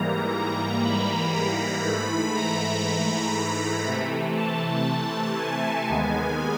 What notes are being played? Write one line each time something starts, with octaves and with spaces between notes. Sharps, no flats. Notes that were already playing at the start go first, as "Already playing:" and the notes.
Already playing: G#2 E3 G3 A#3 A#5
A#5
B5
A#5
G#2 E3 A3 B5
A#5
B5
C3 E3 A3
A5
G#5
D#2 D#3 G#3 B3 G#5